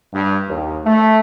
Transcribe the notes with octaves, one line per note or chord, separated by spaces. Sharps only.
G2
D#2
A3